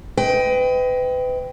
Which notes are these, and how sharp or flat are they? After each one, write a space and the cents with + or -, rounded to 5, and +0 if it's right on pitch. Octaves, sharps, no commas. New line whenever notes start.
B4 +35 D#5 +20 G5 +0